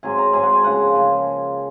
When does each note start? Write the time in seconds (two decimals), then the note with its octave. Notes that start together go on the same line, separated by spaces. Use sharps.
0.03 G#2 F#3 C4 G#5
0.18 A#5
0.33 G#2 F#3 C4 G#5
0.43 F#5
0.53 G#5
0.64 C#3 F3 A#3 F#5
0.95 C#3 F3 A#3